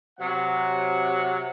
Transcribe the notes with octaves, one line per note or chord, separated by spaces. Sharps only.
C3 F#3 F#5